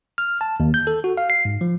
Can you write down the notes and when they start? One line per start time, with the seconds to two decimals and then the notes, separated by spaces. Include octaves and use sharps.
0.18 F6
0.41 A5
0.60 D#2
0.74 G6
0.87 A4
1.04 F#4
1.17 F5
1.30 C7
1.45 G#2
1.61 F3